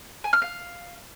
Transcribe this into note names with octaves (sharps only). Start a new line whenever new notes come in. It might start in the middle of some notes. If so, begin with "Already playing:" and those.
G#5
F6
F5